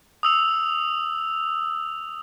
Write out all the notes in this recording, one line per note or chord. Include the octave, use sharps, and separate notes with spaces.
D#6 E6 F7